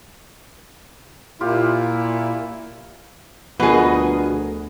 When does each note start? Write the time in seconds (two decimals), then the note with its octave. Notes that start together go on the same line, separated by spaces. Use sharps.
1.41 A#2 E4 F4 G4
3.60 D2 B2 F3 B3 G#4 A#4 D#5